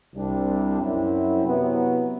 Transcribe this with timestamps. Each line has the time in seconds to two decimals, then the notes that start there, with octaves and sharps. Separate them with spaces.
0.15 C2 C3 G3 D4
0.80 F#2 F#3 C4 E4
1.43 C3 F#3 B3 E4